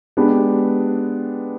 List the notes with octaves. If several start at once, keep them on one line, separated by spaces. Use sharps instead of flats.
G#3 B3 D4 G4